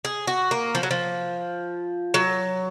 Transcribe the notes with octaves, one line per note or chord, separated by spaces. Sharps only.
G#4
F#4
A#3
F3
F#3
F3
F#3